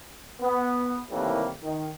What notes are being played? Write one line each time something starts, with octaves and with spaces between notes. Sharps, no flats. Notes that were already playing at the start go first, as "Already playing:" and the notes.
B3
A2 C3 D#3 E3 G3 A#3
D#3